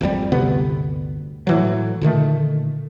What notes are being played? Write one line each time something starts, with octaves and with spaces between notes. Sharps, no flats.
G#1 F2 D3 G3
G1 D2 C3 B3
A2 E3 F#3
A#2 D3 D#3 A3